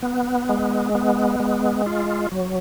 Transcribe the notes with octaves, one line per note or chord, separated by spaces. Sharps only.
B3
G#3
B3
G#3
F4
F#3